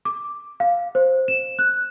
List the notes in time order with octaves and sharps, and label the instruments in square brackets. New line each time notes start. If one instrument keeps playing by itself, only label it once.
[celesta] D6
F5
C5
E7
F#6